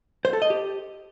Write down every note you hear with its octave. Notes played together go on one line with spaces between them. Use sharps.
C5
A4
D#5
G4